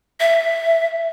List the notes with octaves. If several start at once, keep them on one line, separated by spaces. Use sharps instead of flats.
E5